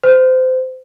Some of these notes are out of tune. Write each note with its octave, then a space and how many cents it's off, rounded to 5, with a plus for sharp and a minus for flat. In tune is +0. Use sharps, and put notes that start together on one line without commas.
C5 -25